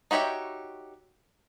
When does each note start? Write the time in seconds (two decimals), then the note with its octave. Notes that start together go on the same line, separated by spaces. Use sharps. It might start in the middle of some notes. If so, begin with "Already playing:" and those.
0.11 D#4 F#4 G4 C#5 E5